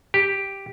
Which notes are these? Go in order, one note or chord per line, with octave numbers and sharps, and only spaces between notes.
G4